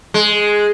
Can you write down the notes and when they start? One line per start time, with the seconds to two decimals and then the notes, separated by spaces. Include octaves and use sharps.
0.14 G#3